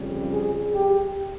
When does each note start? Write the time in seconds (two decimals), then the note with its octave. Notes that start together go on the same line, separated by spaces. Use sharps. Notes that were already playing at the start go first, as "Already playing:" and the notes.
Already playing: F2 C#3 G3
0.31 G#4
0.74 G4